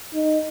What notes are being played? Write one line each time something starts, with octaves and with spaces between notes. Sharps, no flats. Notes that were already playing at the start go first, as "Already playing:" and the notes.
D#4